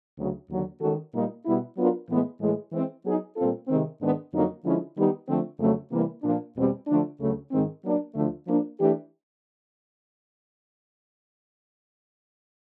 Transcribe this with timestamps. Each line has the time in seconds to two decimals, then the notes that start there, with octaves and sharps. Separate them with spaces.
0.17 D2 C#3 F#3
0.49 D#2 D3 F#3
0.81 D#3 G#3 C#4 F#4 A4
1.13 A#2 G3 A#3 D#4
1.46 B2 G3 B3 E4
1.77 F#3 B3 D4 F4 A#4
2.09 A2 E3 G#3 B3
2.41 A2 E3 G#3
2.73 E3 G#3 C4
3.05 F#3 B3 D#4 G#4
3.37 A#2 G3 C4 F4 A4
3.68 C3 D#3 G#3 C4
4.00 G#2 D#3 G#3 B3 D4
4.33 F2 D3 F#3 A#3 D#4
4.64 D3 F3 G#3 C#4 E4
4.96 D#3 G3 B3 D#4 G4
5.28 D3 F3 A3 C4
5.60 F2 C#3 F#3 A3
5.92 C3 E3 G3 A#3
6.24 A#2 F3 A#3 D4
6.56 E2 B2 G3 C4
6.87 D3 F3 A3 D4
7.20 D2 C#3 F#3 A3
7.51 G#2 D#3 G#3 C4
7.83 F#3 A#3 D4
8.15 D2 D3 F3 A3
8.47 F3 A#3 D4
8.79 E3 A3 D4 G4